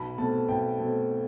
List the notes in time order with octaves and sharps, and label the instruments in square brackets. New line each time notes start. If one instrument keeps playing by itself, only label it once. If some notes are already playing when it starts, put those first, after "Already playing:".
Already playing: [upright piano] B1 B5
B2 A3 C4 A5
B1 G5
B2 A3 C4